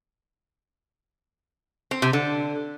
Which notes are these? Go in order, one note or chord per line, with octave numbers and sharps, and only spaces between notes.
C4
C3
D3